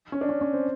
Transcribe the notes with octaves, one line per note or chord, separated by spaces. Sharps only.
C#4
D4
C#4
C#4
C4